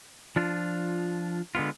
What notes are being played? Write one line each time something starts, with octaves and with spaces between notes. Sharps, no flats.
F3 D4 F4
D3 G#3 B3 F4